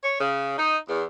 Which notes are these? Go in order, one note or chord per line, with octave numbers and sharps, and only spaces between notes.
C#5
C#3
D#4
E2